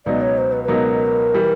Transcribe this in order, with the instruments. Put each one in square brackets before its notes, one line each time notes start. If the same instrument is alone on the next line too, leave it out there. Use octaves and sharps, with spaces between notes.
[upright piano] C#2 B2 F#3 B3 D#4 [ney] D5
[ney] C#5
C5
B4
B4
[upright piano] C#2 B2 F#3 B3 D#4 [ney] A#4
[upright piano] E3 G3